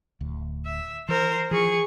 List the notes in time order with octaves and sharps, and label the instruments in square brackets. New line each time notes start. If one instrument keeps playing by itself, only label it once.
[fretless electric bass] D1 D2
[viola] E5
[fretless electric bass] E3 [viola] A#4 C5
[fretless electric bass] E3 F3 [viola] G#4 C#6